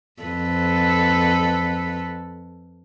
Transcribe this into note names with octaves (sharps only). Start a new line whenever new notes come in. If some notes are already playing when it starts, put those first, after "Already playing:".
F2 A4 B4